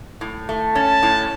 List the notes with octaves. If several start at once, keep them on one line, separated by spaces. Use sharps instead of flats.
A2
A3
C#4 A5
A2